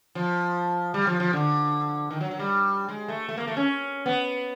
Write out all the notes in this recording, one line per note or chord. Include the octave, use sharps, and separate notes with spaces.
F3
G3
F3
F3
D3
D#3
F#3
F#3
G3
G#3
A3
A3
A#3
A3
C#4
B3